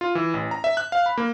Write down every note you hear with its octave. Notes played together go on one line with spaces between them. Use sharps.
F4
E3
A1
A#5
E5
F#6
F5
B5
A#3